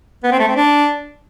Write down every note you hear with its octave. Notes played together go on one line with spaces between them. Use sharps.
B3
C4
A3
C4
D4